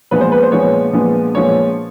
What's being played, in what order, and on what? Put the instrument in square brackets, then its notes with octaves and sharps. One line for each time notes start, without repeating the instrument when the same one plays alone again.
[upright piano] A#2 F3 G#3 B3 B4
C5
B4
C5
A#2 F3 G#3 B3 C#5
A#2 F3 G#3 B3
A#2 F3 G#3 B3 C#5